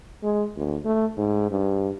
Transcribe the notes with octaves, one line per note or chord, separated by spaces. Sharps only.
G#3
D2
A3
G#2
G2